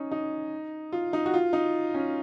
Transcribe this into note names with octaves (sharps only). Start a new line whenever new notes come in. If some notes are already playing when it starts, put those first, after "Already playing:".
Already playing: C#4 D#4
D#4
F4
D#4
F#4
F4
D#4
C#4